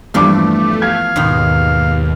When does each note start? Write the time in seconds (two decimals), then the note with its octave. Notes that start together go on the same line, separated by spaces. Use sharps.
0.14 E2 G2 F3 A3 D4 D6
0.82 F5 G#6
1.16 D#2 G#2 B2 D#3